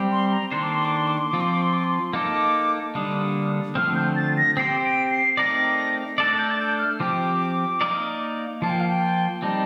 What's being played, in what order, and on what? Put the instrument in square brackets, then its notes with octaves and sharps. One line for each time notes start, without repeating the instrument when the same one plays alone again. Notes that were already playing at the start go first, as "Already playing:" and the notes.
Already playing: [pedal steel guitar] G3 C4 G4
[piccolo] C6
A#5
[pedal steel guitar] D#3 A#3 D4 A4 C5 [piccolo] C6
[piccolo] D6
C6
D6
C6
D6
C6
[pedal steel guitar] F3 C4 F4 [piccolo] D6
[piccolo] C6
D6
C6
D6
C6
[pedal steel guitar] A#3 D#4 A4 [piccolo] D6
[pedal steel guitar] D3 G3 A#3 D4 A4 [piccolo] D#6
[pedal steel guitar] D3 F3 A3 C4 [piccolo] F6
[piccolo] G6
A6
A#6
[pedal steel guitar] C4 G4 C5 [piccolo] C7
[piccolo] D7
C7
[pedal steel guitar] A3 C4 D#4 A#4 D5 [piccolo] A#6
[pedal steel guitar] A3 D4 A4 D5 [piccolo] A6
[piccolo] G6
A6
G6
F6
[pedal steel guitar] F3 C4 G4 [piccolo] D6
[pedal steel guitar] A#3 D#4 A#4 D5
[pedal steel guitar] F3 A#3 F4 [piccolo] A5
[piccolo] G5
F5
G5
[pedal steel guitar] G3 C4 D#4 [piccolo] A5